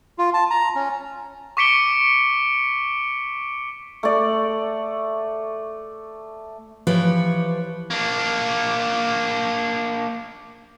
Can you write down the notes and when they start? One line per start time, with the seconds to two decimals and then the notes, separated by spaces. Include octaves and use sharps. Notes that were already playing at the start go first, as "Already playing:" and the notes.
0.18 F4
0.34 A5
0.50 A#5
0.75 C#4
1.57 C#6 D6 B6 C#7 D7 G7
4.03 A3 D5
6.87 E3 F3 G4 B4 C#5
7.91 A#3 D4